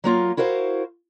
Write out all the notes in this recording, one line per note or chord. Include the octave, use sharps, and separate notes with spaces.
F#3 A#3 F4
E4 F#4 A#4 C5 F5